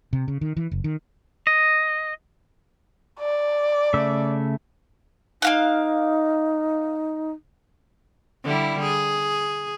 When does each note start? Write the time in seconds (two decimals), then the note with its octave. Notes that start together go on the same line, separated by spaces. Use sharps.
0.13 C3
0.28 C#3
0.41 D#3
0.57 E3
0.71 F#1
0.84 D#3
1.47 D#5
3.19 D5
3.94 C#3 A3 E5
5.42 A#3 D#4 F5 F#6
8.45 D3 G3 E4
8.83 G#4